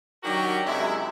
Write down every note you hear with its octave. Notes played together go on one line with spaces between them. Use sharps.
D#3 F#3 D4 F#4 G4 A#4
F#2 C3 G#3 E4